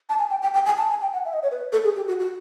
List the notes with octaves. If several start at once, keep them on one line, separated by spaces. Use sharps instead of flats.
A5
G#5
G5
G5
G5
G#5
A5
G#5
G5
F#5
E5
D#5
C#5
B4
A4
G#4
G4
F#4
F#4